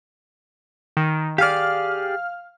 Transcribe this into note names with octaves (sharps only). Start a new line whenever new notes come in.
D#3
G4 G#4 D5 F5 F6